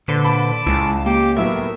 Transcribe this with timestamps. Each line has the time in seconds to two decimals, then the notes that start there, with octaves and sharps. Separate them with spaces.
0.08 A#2 D3 B4 C5
0.24 A5 B5 D6
0.66 C#2 G#3 E4
1.06 A#3 G4 D6
1.37 A2 F#3 B3 A#4 E5